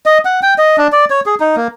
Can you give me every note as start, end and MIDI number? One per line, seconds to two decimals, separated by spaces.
0.06 0.18 75
0.25 0.40 78
0.43 0.54 79
0.58 0.76 75
0.78 0.88 62
0.92 1.05 74
1.10 1.20 73
1.26 1.35 68
1.40 1.56 63
1.56 1.68 58